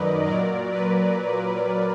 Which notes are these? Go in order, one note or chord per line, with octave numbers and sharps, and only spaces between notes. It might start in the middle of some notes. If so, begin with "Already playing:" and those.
Already playing: F#2 D#3 F#3 A#4 B4 D5 D#5
A#2 F#3 A#4 D5
B4